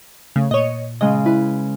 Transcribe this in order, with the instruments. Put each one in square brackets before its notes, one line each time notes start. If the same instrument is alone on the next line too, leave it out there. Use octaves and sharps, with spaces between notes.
[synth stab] C#3 [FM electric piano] A3
[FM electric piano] A#2 [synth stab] C#5 D#5
[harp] C#3 G#3 [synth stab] D#5
[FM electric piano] E4 [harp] B4